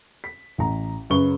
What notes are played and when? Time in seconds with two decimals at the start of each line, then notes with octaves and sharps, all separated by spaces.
0.24 B6
0.58 A1 A#5
1.10 F#2 C#3 B4 C#6 G7